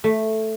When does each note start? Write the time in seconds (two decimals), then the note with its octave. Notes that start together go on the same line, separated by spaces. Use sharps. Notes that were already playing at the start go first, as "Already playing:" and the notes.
0.04 A3